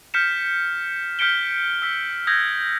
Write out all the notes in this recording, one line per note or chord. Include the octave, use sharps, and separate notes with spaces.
F6 G6 B6 C#7 E7
F6 G6 B6 C#7 D7 G7
E6 B6
D#6 E6 G6 G#6 A#6